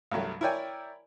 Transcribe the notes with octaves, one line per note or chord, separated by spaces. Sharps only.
C2 G2 F#3 A3
E4 A#4 C#5 D5 G5 G#5